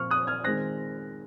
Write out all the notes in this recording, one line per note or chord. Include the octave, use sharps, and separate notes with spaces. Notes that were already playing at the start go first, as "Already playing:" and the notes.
Already playing: A#2 F3 C4 C#6 F6
D#6 F#6
F6 G#6
D#3 G#3 C4 F#6 A#6